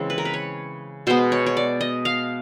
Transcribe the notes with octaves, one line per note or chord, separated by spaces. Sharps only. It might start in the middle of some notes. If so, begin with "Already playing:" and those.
Already playing: C#3 E3 G#3 C4
B4
A#4
B4
C#5
B2 G#3 B3 C5
C#5
C#5
D5
D#5
F5